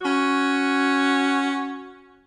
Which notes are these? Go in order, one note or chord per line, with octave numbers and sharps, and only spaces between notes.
C#4 F#4